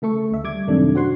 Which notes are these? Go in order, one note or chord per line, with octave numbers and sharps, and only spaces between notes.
C#3 A3 A4 C#6
D2 E5
G3 D6 G#6
F#2 A2 C3 D#3 A3 D4
F#4 C5 F#5 C6